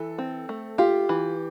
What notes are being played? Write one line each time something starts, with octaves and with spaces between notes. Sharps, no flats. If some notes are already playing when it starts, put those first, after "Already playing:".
Already playing: E3 A4
C4
A3
F4 G4
E3